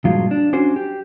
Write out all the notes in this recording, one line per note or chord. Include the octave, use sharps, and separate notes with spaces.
G2 A#2 F3 F#3 G#3 F4
D4
C#4 D4 F#4 C5
G4